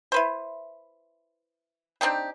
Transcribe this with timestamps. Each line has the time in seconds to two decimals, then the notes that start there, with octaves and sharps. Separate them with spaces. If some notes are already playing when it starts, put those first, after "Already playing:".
0.12 E4 B4 C5
2.01 C4 D4 D#4 G4